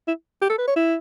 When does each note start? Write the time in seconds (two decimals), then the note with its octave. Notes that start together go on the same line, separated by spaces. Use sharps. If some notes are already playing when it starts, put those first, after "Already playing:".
0.08 E4
0.42 G4
0.50 A4
0.58 B4
0.68 C#5
0.76 E4